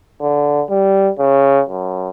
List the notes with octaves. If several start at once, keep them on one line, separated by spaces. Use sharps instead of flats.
D3
G3
C#3
F#2